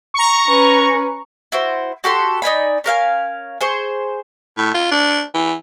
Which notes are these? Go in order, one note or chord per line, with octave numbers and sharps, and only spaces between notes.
A#5 C#6
C#4 B4
E4 F#4 C5
F#4 G4 A4 C6
D#4 D5 G#5 B5
C#4 A#4 F5 G#5
G#4 C5 C#6
A2
F4
D4
E3